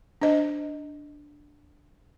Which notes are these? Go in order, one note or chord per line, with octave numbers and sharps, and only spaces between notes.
D4 C5 D#5